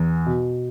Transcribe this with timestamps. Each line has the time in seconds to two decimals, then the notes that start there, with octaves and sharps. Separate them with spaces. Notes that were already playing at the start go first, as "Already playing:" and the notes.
Already playing: E2
0.26 B2